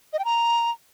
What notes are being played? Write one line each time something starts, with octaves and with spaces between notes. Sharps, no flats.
D#5
G5
A#5